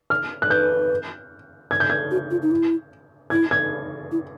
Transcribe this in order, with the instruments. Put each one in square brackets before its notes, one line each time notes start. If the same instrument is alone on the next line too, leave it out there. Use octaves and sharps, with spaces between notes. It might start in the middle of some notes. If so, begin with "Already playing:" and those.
[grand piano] F6
F#6
[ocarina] B4 [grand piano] G6
[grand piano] G#6
G6
G#6
[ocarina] F#4
F4
D#4
E4
[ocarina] E4 [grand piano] G#6
[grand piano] G#6
[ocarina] E4